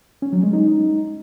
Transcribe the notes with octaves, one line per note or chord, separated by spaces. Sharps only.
C#4
F#3
G#3
D#4